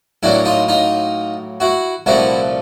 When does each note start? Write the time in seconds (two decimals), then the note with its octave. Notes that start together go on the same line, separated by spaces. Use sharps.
0.23 A2 F#3 A#3 D4 E4
0.45 D#4 F4
0.68 D#4 F4
1.60 E4 F#4
2.06 C2 A#2 F3 A3 E4 F#4